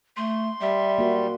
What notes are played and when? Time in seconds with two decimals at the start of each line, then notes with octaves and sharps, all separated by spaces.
0.17 A3 C6
0.61 G3 E5
0.98 A#3 F#4